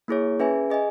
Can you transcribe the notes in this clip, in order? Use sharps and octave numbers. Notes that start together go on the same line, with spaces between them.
A#3 E4 G#4 C#5
C#4 G#4 B4 E5 G#5
G#4 D#5 G#5